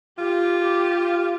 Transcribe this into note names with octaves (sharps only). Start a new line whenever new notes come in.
F4 G4
G4